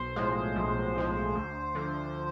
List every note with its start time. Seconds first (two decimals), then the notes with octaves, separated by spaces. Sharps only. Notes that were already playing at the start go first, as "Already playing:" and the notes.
Already playing: B1 C5
0.16 A2 F3 G#3
0.56 B1
0.96 A2 F3 G#3
1.35 D2
1.75 D3 F3